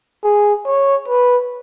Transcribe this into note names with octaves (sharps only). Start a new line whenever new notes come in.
G#4
C#5
B4